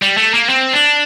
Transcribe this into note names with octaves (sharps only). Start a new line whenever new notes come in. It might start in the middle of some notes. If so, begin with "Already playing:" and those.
G3
A3
A#3
C4
D4